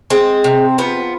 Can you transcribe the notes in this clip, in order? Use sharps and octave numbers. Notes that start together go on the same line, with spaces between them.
G#3 C4
C3
F3 B3